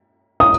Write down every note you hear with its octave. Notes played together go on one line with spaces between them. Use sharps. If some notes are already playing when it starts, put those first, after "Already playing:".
D#6